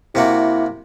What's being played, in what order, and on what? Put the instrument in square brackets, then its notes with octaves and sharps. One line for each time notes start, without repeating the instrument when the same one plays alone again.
[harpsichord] C3 A#3 F#4 [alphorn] E4